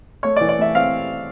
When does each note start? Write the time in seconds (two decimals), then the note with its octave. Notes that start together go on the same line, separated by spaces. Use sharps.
0.23 A3 C#5
0.36 D5
0.40 E3
0.49 D5
0.58 A3 E5
0.74 C4 F5